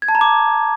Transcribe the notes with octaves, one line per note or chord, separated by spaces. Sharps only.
G#6
A5
A#5
D6